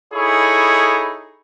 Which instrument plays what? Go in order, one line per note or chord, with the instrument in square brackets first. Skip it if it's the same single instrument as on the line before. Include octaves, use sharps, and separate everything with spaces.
[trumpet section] D#4 E4 G#4 A4 C#5 B5